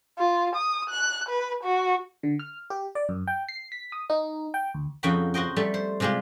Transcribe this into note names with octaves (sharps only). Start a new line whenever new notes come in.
F4
D#6
F#6
B4
F#4
D3
F6
G4
D5
F#2
G5
C7
B6
D#6
D#4
G5
D2
F2 C#3 D#4 F#4 G5 B5
F#4 C5 D#5 G5
G3 A3 A4
C5
C3 G3 G#3 F4 G4